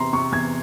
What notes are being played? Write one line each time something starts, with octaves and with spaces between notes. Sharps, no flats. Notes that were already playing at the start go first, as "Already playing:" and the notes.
Already playing: E2 C3 A#5 C6
C3 C#6
E2 G#6